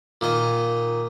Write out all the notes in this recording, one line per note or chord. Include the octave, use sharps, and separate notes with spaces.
A#2 D#3 D#5